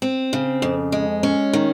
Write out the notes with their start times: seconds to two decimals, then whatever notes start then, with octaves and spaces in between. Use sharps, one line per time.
0.02 C4
0.33 C#3
0.62 F2
0.92 G#3
1.23 C#4
1.53 D#3